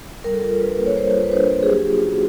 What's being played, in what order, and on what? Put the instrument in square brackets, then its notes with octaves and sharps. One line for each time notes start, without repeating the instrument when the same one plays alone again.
[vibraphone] G3 A#4
A4
F4 A#4
D4 B4
A#3
C#5
G3 C5
F4
B4
D4 C5
A#3
G#4
F#3 G4
F4
C#4 F#4